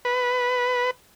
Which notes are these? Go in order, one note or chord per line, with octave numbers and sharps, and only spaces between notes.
B4